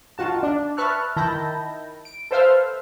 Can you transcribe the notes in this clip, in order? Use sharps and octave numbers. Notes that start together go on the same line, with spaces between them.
D#3 F4 F#4 A5
D4
B4 E5 A5 C#6 F6 F#6
D#3 E4 A5 B5 G6 A#6
D7
A4 B4 C5 E5 F5 F6